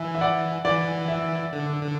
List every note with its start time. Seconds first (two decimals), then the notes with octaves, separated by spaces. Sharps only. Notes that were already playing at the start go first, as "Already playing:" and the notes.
Already playing: E3 E5 G#5
0.15 E5
0.21 D5 F#5
0.65 E3 D5
1.08 E5
1.53 D3
1.81 D3